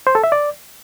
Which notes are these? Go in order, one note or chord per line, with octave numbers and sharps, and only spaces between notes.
C5
A4
E5
D5